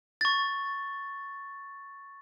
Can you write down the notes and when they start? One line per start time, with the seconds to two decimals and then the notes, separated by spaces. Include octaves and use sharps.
0.21 C#6 A6